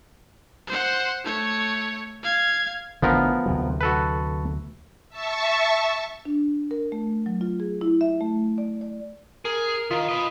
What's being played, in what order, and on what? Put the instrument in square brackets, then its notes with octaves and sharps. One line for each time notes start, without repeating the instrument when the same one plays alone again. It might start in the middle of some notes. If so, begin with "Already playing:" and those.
[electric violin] C5 F#5
A3 C#5
F5 G#6
[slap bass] A1 D3 [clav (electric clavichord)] F3 B3 A#4
[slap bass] D2 C3 F#3
[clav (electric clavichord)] F#4 A4 B4
[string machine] E5 A5 C#6
[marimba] D4
A#4
A3
F#3
F4
G#4
E4
E5
A3
D5
D5
[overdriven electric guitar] G#4 [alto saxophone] A#4
[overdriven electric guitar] D#3 [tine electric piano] F4 D#6 B6
[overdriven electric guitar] B4 D#5